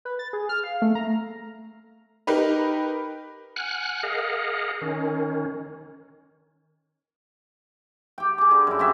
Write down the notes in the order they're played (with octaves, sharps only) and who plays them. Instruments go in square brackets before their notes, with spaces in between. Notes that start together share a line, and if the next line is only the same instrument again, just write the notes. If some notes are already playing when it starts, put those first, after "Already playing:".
[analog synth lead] B4
A6
G#4
F6
F5
A3
A#5
[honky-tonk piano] D#4 G4 A#4 B4
[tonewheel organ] F#5 G#5 F6 F#6
G#4 A#4 D#5 F5 F#5
D#3 C#4
[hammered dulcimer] G4 G5
G#4 D6
D3
F#2 E4
G3 C4 F#4 E5